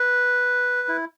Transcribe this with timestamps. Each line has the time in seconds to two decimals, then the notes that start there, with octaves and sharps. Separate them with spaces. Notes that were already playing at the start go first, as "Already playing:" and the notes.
Already playing: B4
0.88 E4